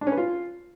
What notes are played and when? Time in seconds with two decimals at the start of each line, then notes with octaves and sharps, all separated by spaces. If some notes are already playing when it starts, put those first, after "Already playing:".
0.01 D4
0.07 C#4
0.12 B4
0.17 F4